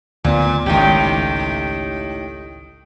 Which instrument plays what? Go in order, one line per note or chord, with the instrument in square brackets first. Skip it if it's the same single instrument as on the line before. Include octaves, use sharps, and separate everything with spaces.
[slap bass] D2 B3 [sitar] A#2
[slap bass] G#1 C#2 [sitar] A2 D#3 G4